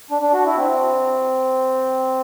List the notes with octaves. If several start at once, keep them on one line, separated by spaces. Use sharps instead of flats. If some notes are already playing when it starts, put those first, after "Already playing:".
D4
D4
F#4
E4
C4